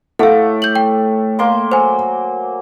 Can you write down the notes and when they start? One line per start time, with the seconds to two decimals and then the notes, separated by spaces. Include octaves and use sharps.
0.19 A2 A3 F5 F#5 D6
0.62 G6 F#7
0.76 G5
1.39 A#3 C6 D6
1.72 F#3 C5 G#5